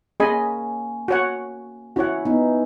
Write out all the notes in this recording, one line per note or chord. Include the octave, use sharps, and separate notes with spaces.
A#3 C#4 G#4 D#5 G#5 B5
F#4 C#5 F#5
C#4 E4 F#4 C#5 F#5
B3 D#4